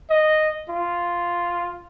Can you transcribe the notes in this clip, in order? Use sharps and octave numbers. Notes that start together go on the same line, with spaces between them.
D#5
F4